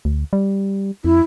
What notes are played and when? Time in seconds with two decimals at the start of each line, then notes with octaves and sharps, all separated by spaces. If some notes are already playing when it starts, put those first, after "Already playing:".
0.05 D2
0.33 G3
1.05 F2 E4